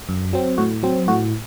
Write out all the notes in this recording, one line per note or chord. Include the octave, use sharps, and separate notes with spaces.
F#2
F#3 C4
A2 F#4
F#3 C4
A2 F#4